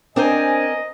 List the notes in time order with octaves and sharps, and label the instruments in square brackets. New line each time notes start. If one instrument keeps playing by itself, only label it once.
[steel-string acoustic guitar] C4 A#4 [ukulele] D4 C5 [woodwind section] D5 G#5 [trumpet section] D#5